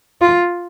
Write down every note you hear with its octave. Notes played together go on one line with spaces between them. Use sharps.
F4